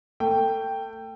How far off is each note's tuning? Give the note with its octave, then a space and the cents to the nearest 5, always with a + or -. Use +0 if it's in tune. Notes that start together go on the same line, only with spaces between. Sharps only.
A3 +30 G5 +0